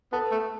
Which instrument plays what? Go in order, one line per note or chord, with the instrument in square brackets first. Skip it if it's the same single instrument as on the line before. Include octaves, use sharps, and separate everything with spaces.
[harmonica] B3 [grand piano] A4 A5
[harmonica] A3